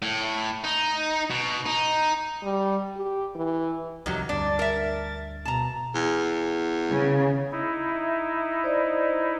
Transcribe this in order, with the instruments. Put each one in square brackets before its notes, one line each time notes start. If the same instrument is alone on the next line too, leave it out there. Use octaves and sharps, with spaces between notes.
[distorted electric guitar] A2
D#4
B2
D#4
[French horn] G3
G4
E3
[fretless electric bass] C2 F2 [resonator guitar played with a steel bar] D#3 F#3 G4
[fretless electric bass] D2 G2 [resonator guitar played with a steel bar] D4 [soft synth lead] A6
[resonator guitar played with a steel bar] A#4 E5
[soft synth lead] B2 [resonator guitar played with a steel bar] A5 A#5
[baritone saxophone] E2
[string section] C#3
[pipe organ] D#4 E4
[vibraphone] E5
C5 D5 D#5